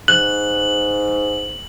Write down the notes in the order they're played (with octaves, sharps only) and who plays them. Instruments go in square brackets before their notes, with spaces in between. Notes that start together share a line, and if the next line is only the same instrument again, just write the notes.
[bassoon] G#2 [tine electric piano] F#6 [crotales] F#7